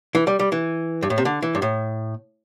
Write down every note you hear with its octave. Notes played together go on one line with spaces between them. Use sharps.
E3
G3
G3
E3
G2
A2
C3
D3
E3
G2
A2